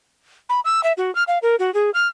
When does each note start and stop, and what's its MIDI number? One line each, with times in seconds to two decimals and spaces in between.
0.49 0.60 83
0.65 0.83 88
0.83 0.93 76
0.97 1.13 66
1.15 1.23 89
1.27 1.38 77
1.42 1.56 70
1.59 1.73 66
1.74 1.90 68
1.94 2.07 89